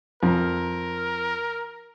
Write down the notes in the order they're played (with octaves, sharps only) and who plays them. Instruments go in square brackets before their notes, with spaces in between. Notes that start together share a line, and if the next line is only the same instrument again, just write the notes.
[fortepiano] F2 [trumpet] A#4